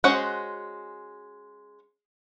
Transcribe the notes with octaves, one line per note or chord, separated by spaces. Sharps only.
G#3 C#4 F#4 C5 F#5